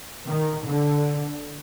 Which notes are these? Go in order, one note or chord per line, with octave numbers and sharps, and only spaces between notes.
D#3
D3